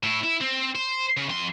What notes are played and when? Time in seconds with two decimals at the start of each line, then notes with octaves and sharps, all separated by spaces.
0.03 A2 E4
0.24 E4
0.41 C4
0.75 C5
1.17 C#3
1.29 F2 C6